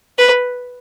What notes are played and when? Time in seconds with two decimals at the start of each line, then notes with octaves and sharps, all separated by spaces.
0.18 B4